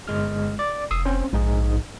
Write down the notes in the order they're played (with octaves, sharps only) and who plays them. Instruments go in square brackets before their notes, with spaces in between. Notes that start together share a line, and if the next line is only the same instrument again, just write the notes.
[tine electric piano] G1 G#3 F6
D5
[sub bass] F1 [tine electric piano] D#6 E6 C7
[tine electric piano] C4 C#4 C5
[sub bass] A#1 [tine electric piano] G#2 D#4 G#4